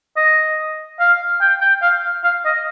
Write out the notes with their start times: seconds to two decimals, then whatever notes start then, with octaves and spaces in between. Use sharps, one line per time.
0.16 D#5
1.00 F5
1.42 G5
1.61 G5
1.83 F5
2.24 F5
2.45 D#5